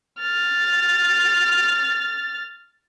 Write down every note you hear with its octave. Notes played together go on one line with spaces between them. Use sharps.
F6 A6